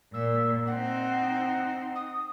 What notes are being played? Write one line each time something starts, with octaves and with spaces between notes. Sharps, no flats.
A#2 E6
C4 D#4 F#5
D#6